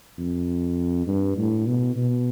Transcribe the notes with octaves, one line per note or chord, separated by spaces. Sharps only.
F2
G2
A2
B2
B2